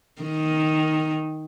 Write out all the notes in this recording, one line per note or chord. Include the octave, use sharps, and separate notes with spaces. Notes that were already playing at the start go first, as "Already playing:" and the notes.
D#3